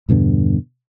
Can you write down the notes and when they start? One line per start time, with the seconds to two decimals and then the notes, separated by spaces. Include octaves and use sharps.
0.09 E2 G2 B2 D3